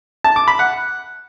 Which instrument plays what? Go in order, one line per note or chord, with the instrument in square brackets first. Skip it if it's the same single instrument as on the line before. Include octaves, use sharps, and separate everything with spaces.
[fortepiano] A5
D6
B5
F#5